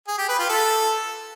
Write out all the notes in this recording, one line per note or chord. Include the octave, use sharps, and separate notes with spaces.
G#4
G4
B4
F4
A4